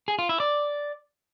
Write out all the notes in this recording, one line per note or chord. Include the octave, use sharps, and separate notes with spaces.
G#4
F4
E4
D5